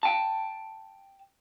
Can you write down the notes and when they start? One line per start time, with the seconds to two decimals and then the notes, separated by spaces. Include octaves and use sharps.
0.03 G5 A5